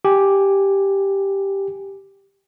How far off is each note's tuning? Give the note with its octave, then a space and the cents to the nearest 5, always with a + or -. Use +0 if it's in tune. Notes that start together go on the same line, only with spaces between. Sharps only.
G4 +0 G#5 -5